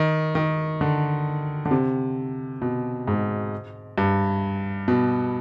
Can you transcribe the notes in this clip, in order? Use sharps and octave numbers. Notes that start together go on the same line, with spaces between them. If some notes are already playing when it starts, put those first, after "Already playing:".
Already playing: D#3
D#3
D3
D3
C3
B2
G#2
G2
B2